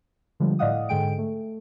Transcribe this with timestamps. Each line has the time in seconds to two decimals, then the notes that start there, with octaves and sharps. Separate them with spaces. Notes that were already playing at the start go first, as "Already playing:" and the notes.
0.40 D3 F3 G3 G#3
0.59 A2 D5 D#5 F5 F#5 D#6
0.89 G#2 D3 G#3 G5 D7
1.18 A3